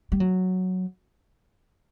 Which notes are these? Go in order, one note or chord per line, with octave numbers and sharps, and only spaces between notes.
G3
F#3